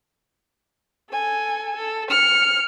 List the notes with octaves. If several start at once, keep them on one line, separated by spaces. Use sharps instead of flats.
A4 G#5
A4
F6 C#7